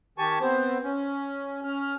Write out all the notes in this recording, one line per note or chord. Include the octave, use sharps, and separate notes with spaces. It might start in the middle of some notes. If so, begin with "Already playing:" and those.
D#3 G4 G#5 A5 C#6
B3 C4 C5
C#4
C#4 F6